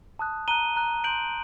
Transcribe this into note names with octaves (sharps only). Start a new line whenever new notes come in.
A5 D#6 F#6
A#5 F#6 D#7 G7
A#5 F#6
C6 G6 D7 F#7